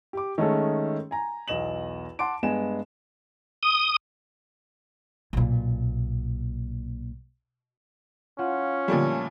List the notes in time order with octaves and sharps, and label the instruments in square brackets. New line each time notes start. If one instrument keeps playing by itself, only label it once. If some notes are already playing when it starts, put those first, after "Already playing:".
[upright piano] G4 D6
D#3 G#3 A3 C#4 G#4 A4
G#5 A#5
B1 E2 D#5 E7 F#7
F#5 A5 C6 D6 D7
G2 G#3 B3 G#5 E7
[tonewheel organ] D#6
[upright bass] B1 A#2
[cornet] C#4 [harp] F4 F#5 E7
[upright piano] A#2 F3 G3 [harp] D3 A3